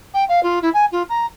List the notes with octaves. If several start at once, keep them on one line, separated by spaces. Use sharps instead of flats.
G5
F5
F4
E4
G#5
F4
A#5